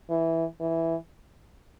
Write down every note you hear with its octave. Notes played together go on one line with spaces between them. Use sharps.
E3
E3